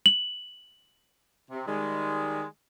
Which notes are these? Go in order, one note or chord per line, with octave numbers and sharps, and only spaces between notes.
F#7
C3
D#3 G3 G#3